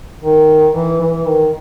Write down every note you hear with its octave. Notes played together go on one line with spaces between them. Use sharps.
D#3
E3
E3
D#3